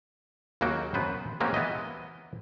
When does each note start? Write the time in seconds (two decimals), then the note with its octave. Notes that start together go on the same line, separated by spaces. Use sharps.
0.61 D#2 C#3 F#3 A#3 F#4 G5
0.94 F#2 B3 B4 C5
1.40 G#3 A#3 C4 C#4 F#4 G4
1.54 E3 B3 E4 D#5